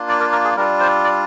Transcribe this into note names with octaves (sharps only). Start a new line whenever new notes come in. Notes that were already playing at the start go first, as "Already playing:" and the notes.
Already playing: A#3 D4 F4
D5
A#4
A#4
G#4
G3 D4 F4 A#4
C5
D5